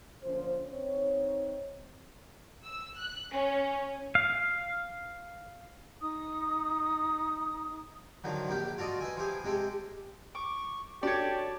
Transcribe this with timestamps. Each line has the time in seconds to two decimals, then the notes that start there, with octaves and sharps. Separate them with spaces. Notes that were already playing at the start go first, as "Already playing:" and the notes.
0.23 D3 F3 A#3 C#4 C5
0.67 C4 D#4 C#5
2.63 E6
2.97 F#6
3.31 C#4
4.15 F5
6.00 D#4 D#6
8.24 D3 D#3 F3 F#3
8.49 A#1 A#3 G4 G5 B5
8.78 F4 F#4 A4 D5 D#5
9.00 B4 D#5 E5 G#5
9.17 F3 E4 G4 G#4
9.44 C3 G#3 G4 A4
10.35 C#6 D6
11.03 D4 F#4 G4 A4 C#5 D5 A5